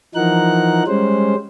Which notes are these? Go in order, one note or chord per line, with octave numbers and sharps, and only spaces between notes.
E3 F3 D#4 A#4 F#5 F#6
G3 G#3 C#4 C5